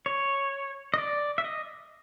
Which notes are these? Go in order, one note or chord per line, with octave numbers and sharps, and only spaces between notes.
C#5
D#5
D5
E5
D#5